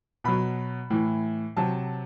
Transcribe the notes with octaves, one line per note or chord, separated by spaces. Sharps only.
B2 F#3 B5
A2 E3
C3 F#3 A5